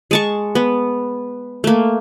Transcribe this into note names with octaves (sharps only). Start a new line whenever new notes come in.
G#3 A5 C#6
B3
A3 A#3